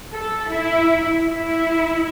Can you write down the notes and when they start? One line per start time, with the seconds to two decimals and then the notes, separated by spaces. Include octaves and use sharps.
0.13 A4
0.50 E4
1.28 E4